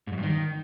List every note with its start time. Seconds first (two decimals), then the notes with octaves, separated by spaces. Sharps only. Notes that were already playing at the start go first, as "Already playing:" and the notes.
0.07 G#2
0.12 F#2
0.17 G2
0.23 D#3